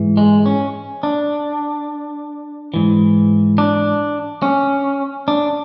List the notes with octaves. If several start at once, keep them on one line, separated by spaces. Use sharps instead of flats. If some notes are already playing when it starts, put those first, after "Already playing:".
Already playing: G#2 E3
G#3
C#4
D4
G#2 E3
D4
C#4
D4